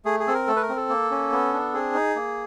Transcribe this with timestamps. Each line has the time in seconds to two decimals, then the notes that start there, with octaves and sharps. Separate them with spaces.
0.05 A3 G#4
0.20 G#4
0.27 C4 A4
0.34 A#4
0.47 A3 A4
0.56 B4
0.62 A#4
0.69 C4
0.76 A4
0.89 A#3
1.11 C#4
1.32 B3
1.53 D4
1.74 C4 G#4
1.95 D#4
2.16 A#3